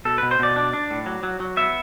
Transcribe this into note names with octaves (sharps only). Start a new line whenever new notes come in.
B2 A4
B2 B4
C5
B2 D5
D4
D4
A2
F#3
F#3
F#3
B3 E5